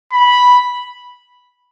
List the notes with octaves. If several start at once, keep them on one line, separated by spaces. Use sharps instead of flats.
B5